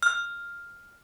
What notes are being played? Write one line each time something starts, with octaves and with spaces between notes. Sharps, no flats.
F6